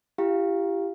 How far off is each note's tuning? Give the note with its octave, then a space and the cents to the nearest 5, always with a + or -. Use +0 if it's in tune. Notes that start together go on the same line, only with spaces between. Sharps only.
E4 +40 G4 +0 F5 +0